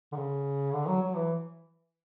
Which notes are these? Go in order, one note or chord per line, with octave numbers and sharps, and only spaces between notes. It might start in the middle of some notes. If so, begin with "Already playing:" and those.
D3
C#3
D3
F#3
F#3
E3